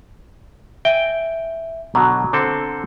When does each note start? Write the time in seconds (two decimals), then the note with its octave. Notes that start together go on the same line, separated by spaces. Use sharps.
0.85 E5 G5 G#5
1.95 B2 D3 F#3 A#5
2.33 D3 C4 A4